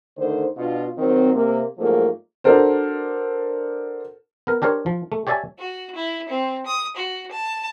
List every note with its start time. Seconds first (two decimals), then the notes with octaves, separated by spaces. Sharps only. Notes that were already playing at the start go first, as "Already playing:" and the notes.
0.18 D3 D#3 A3 C5
0.58 B2 D4 F4
0.98 D#3 F#3 C4
1.34 C3 A#3
1.78 G#2 F3 F#3 A3 A#3
2.44 D4 F#4 A4 A#4 C5
4.47 B3 A#4
4.62 D4 G4 A#4 C5 C#5
4.86 F3
5.12 A3
5.27 G4 C#5 D5 E5 G#5 A5
5.59 F#4
5.95 E4
6.29 C4
6.66 D#6
6.96 F#4
7.31 A5